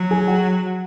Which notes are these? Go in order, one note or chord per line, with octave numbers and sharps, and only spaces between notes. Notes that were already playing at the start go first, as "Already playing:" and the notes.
Already playing: F#3
G#4 G#5
F#4 F#5